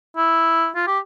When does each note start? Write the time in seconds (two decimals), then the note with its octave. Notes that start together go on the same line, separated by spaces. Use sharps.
0.17 E4
0.76 F4
0.87 G4